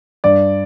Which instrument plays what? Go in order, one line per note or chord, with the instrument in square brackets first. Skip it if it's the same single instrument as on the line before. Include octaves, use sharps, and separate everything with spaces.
[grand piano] G2 D5